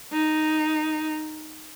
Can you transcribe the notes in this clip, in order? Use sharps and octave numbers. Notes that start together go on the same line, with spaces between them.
D#4